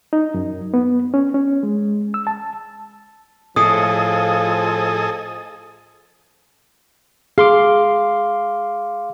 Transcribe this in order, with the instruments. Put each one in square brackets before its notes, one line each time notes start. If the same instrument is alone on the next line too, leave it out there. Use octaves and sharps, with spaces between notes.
[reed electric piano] D#4
F#2
B3
C#4
C#4
G#3
E6
A5
[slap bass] A2 [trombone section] F3 [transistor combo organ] G#4 A4 D#5 [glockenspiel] D#6
[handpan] G#4 [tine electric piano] F5 C6 D6